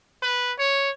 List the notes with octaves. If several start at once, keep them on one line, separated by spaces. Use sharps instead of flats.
B4
C#5